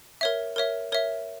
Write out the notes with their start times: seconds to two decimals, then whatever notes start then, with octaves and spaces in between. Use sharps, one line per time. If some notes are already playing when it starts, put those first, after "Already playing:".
0.21 A#4 C#5 E5
0.56 A#4 C#5 E5
0.92 A#4 C#5 E5